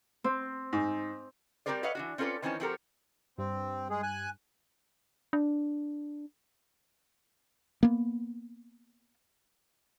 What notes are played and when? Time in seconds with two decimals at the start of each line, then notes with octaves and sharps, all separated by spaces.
0.24 C4
0.73 G#2
1.66 G3 C4 G4 A#4 C5 D5
1.83 A4 B4 C#5 D#5 F5 F#5
1.95 E3 D4 F#4
2.18 C4 C#4 F4 A4 B4 D5
2.42 D#3 E3 C4 C#4 A5
2.60 F3 C4 F#4 G4 A4 A#4
3.38 G2 C4
3.90 G#3 G#4
4.03 G#5 F#6
5.33 D4
7.83 A#3 B3